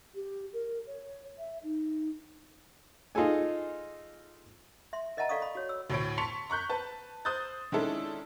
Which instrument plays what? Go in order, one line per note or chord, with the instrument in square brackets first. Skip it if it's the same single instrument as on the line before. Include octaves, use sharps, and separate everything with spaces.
[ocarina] G4
A#4
C#5
E5
D#4
[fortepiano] D#4 F4 G#4 A4 G#5
[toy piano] E5 C6
A#4 D#5 E5 F#5 A5 A#5
A4 D5 F5 C#6 D#6
B5
F#4 C#5
E6
[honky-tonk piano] D2 A2 C#5 D7
A5 C6 C#6 B6 C#7 F7
A#5 C#6 F#6 G6 B6
B4 A5
C5 D#6 F#6 G6 A6
D#3 G#3 C#4 D4 E4 A4